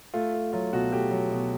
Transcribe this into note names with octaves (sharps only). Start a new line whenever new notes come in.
A3 F4
A3
F#3 F4
B2 F#4
A3 G4
F#3
B2